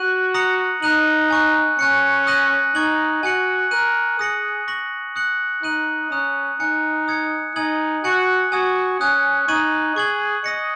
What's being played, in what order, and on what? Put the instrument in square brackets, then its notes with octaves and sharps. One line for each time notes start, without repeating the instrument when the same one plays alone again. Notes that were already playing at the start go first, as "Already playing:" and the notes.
Already playing: [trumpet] F#4 [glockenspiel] F#6 D#7 F#7
[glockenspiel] A#5 D#6 A#6 C#7 F#7
[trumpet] D#4 [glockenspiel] A#5 F#6 D#7 F#7
[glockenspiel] G#5 C#6 F#6
[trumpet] C#4 [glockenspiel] G#5 F#6 C#7
[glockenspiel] D#6 F#6 A#6 D#7 F#7
[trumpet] D#4 [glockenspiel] C#6 G#6 F#7
[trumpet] F#4 [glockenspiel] G#5 F#6 C#7 F#7
[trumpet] A#4 [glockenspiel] F#6 D#7 F#7
[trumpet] G#4 [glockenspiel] D#6 A#6 C#7 F#7
[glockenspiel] C#6 A#6 F#7
D#6 F#6 C#7 F#7
[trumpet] D#4 [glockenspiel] F#6 D#7 F#7
[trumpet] C#4 [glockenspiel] A#5 D#6 F#6
[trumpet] D#4 [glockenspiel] G#5 F#6 C#7
[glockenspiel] D#6 G#6 C#7
[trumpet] D#4 [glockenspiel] G#5 D#6 G#6 F#7
[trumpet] F#4 [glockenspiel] G#5 F#6 C#7 F#7
[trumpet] F#4 [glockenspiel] G#5 D#6 G#6
[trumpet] C#4 [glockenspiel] G#5 D#6 F#6
[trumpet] D#4 [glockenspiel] C#6 G#6 D#7 F#7
[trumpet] G#4 [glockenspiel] C#6 G#6 F#7
[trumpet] D#5 [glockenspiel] D#6 A#6 C#7